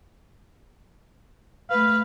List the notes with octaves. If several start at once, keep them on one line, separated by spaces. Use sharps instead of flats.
A3 B4 F5